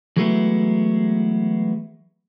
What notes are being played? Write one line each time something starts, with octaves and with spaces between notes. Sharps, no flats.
E3 F#3 G#3 A3 B3 E4